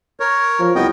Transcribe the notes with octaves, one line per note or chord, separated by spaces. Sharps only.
A#4 C#5
F3
C2 B3 D#5 G5